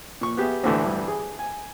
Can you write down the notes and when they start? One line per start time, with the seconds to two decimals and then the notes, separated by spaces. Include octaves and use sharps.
0.21 A#2 C#6
0.37 B3 G4 G#4 E5
0.63 D2 A2 D3 E3 A3
0.84 G2 E3
1.08 G#4
1.39 G#5